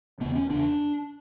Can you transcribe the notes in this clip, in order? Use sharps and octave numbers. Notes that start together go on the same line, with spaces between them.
E2 C#3 B3
C#4
E2 C#3 D4